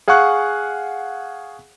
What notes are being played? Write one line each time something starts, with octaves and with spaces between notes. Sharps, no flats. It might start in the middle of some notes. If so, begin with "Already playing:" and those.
G#4 F5 F#5 G#5 C#6 F#6